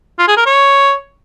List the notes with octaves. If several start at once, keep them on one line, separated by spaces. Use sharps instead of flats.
F4
G#4
A#4
C#5